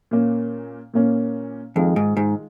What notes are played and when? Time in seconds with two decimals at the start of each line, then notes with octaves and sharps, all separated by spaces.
0.11 A#2 A#3 C#4
0.94 A#2 A#3 C#4
1.75 F2 D#3 G#3 F4
1.96 G#2
2.17 G#2